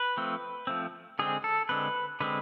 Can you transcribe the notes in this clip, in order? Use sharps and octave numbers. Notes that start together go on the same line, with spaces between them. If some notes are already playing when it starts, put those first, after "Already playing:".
Already playing: B4
F3 A3 C4
F3 A3 C4
D3 G#3 C4 G#4
A4
D3 G#3 C4 B4
D3 G#3 C4 B4